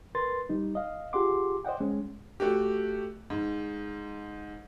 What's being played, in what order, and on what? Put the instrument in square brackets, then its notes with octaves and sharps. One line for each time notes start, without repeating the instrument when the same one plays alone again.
[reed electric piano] A#4 B4 C6 A6
G3 D#4
D#5 F5
F4 G4 G#4 F#5 C6 D6
C5 D5 D#5 F#5 G5
G#3 C#4
[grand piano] A3 F#4 G4
G#2